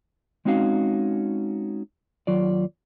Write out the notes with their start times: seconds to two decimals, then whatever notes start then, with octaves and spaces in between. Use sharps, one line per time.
0.45 G#3 C4 C#4 D#4 F#4 F5
2.27 D#2 F#3 F4 D5